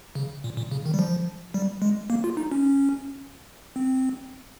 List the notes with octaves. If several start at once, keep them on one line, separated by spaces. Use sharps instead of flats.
C#3
A#2
A#2
C#3
D#3
G3
F3
G3
G#3
A#3
F4
D#4
C#4
C4